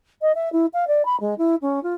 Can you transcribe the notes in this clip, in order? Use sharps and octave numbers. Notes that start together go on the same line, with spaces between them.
D#5
E5
E4
F5
D5
B5
G#3
E4
C#4
F4